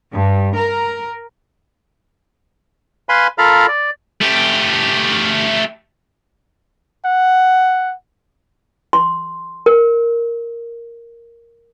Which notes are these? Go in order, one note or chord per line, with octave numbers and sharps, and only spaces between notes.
G2
A#4
B4 F5 G#5 B5 C6
F4 A4 A#4 F5 A#5 B5
D5
A3 G4
F#5
C6
A#4